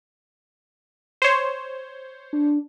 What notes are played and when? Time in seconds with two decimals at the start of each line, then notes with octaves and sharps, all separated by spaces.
1.22 C5 C#5
2.33 D4